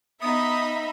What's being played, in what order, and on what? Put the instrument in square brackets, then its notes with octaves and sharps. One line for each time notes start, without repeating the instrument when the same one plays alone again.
[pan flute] B3 [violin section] D#4 E5 B5 [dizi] D#6